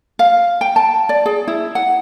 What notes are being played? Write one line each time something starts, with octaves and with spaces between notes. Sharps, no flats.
F5
G5
A5
D5
G#4
E4
F#5